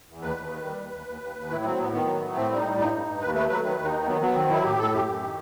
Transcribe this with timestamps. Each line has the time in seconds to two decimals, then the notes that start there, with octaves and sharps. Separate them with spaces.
0.08 E2
0.21 D#2 B4
0.36 D#2
0.50 D#3
0.65 G3
0.79 D#2
0.93 D#2
1.07 D#2
1.22 D#2
1.36 D#2
1.50 A2 E4
1.64 F#3 C4
1.79 A2 B3
1.92 D#3 B3
2.07 F#3
2.22 A3
2.35 A2 C4
2.50 G3
2.57 D#4
2.65 A2
2.78 G2 D#4
2.93 G2
3.07 G2
3.21 D#2 B4
3.35 A3 B4
3.49 F#3 B4
3.64 D#3 B4
3.78 D#2
3.85 D#4
3.93 D#3
4.06 F#3 B3
4.21 F#3 B3
4.35 D#3 C4
4.49 F#3 E4
4.64 A2 G4
4.78 A2 A4
4.92 F#2 G4
5.07 F#2
5.21 D#3